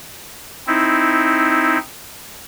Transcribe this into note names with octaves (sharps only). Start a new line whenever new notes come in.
C4 D#4 E4